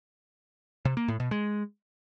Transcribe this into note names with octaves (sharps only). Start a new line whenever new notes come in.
C3
A#3
A2
B2
G#3